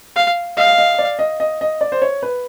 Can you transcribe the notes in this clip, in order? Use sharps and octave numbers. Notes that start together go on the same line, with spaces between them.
F5
D#5 F5
D#5
D5
D#5
D#5
D#5
D5
C5
C#5
B4